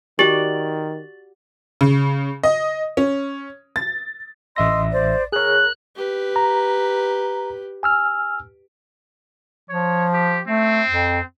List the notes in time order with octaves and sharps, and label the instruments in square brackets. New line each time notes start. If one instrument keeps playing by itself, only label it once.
[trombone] D#3 [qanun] F#4 D5 [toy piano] G4 [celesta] A6 F#7
[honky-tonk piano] C#3
D#5
C#4
A6
[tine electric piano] A1 E5 A#6 [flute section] D#5 C6 E6
[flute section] C5 D5
[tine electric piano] G#4 C#5 [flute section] A#4 [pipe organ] F#6
[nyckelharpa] G4 B4
[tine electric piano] A#5
G#5 E6 F6
[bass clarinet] F3 [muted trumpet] C#5
[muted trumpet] G4
[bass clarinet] A3 [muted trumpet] C4
[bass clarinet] F2